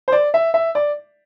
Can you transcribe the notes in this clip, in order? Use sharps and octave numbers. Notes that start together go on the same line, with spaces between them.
C5
D5
E5
E5
D5